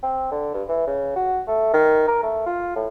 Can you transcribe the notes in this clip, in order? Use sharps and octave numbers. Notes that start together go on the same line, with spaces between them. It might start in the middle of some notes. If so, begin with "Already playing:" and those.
C4
D3
G2
E3
C#3
F#4
A3
D#3
A#4
A3
F4
A2